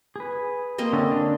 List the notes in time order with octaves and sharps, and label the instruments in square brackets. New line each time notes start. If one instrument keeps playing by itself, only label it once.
[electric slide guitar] G#4 B4
[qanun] A#3 C4 D#5
[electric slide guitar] D3 C#4 A4
D3 D4 D5